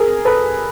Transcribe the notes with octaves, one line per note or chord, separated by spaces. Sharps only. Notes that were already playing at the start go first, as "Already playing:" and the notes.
Already playing: G#4 A#4
A4 B4